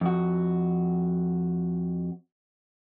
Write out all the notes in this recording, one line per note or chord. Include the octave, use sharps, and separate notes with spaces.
F2 F#4